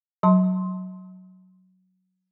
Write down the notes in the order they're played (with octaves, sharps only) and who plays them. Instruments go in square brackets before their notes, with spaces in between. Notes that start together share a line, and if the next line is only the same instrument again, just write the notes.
[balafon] F#3 A5 C6